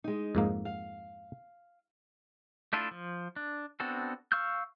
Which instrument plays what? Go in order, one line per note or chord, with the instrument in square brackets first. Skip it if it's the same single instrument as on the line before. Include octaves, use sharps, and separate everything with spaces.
[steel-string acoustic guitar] G#3 D#4
[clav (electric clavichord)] F2 G#2 A#3
[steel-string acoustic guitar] F5
[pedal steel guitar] A3 D4 E4 F4 A4
F3
D4
B3 C4 D4 F#4 A4
F5 C#6 E6 F6 G6